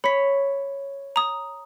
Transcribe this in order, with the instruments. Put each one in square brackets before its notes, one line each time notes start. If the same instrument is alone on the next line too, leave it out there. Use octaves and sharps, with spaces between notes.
[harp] C#5 [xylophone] B5 B6
[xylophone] A#5 D#6